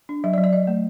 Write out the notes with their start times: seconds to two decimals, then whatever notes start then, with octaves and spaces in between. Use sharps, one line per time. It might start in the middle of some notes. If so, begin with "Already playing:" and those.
0.09 D4
0.24 F#3 E5
0.34 D5
0.38 F#3
0.44 D5
0.53 F#3 D#5
0.67 A3